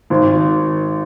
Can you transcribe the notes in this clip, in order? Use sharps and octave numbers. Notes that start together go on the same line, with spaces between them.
G#1